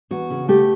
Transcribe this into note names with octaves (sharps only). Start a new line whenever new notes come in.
E2 F#4
C#3
A3 G4